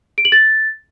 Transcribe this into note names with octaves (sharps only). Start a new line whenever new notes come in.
D7
F#7
A6